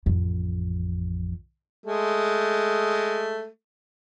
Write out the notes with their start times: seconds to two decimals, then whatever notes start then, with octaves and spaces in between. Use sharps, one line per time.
0.06 A1 F2
1.85 G#3 A3